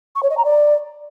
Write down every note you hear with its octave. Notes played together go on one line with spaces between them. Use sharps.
C#6
C#5
D#5
A#5
D5